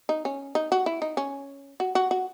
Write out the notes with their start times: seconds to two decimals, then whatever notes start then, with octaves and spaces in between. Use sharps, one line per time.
0.09 D#4
0.25 C#4
0.55 D#4
0.72 F#4
0.86 E4
1.02 D#4
1.17 C#4
1.80 F#4
1.95 F#4
2.11 F#4